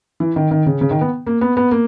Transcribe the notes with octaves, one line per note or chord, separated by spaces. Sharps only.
E3
D#3
D#3
C#3
C#3
D#3
B3
A#3
B3
B3
A#3